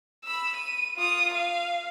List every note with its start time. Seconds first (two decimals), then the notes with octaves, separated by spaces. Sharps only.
0.24 B5 E6
0.56 D#7
0.97 F4 D#6
1.34 F5